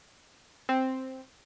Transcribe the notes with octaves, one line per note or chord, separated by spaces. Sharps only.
C4